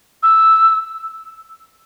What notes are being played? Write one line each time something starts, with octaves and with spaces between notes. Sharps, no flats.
E6